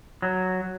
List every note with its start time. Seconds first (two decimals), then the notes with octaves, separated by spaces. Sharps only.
0.22 F#3